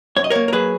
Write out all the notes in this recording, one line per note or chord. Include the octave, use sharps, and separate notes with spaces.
F#2 C#5
D#5
A#3 A#4 C#5
A#4
F#3 G#4 B4